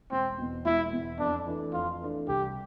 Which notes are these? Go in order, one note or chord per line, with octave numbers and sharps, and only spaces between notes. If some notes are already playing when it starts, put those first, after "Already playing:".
E1 C4
E2 B2
E1 E4
E2 B2
F2 D4
E3 A3 D4
F2 F4
E3 A3 D4
C2 G4